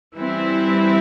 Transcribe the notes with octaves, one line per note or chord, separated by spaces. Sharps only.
E3 G3 C4 E4